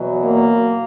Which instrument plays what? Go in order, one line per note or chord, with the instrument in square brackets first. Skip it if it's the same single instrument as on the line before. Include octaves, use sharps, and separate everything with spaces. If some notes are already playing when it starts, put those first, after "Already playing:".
Already playing: [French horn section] E2 B2 F#3
A#3